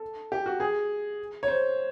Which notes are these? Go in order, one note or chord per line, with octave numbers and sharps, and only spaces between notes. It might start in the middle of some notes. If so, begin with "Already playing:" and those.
Already playing: A4
G4
F#4
G#4
C#5
C5